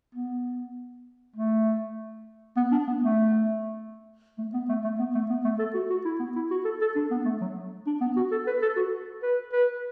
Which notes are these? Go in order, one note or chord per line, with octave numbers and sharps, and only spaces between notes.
B3
A3
B3
D4
B3
A3
A3
B3
A3
A3
B3
A3
B3
A3
A4
F#4
F#4
E4
B3
E4
F#4
A4
A4
D4
B3
A3
F#3
D4
B3
F#4
A4
B4
A4
F#4
B4
B4